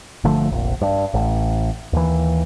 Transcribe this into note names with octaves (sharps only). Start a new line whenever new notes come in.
G1 D3 F3 A3
F1 A#1
G2
A1
D#2 E3